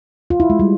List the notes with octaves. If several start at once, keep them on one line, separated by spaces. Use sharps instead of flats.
F4
E4
G#3
G3